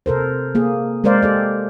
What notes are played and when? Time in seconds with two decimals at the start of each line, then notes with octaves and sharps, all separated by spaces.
0.06 C3 A4 A#4 C5
0.55 A#3 G#4
1.04 G#3 A#4 C5 D5 F5
1.22 G4 A4 D5